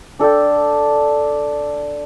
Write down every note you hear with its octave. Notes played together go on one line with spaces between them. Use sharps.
D4 A4 D5 G5